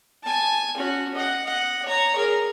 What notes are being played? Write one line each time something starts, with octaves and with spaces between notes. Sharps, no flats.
G#5 A5
C#4 F#4
D#5 F#5
D#5 F#5
C#5 A#5
G#4 A#4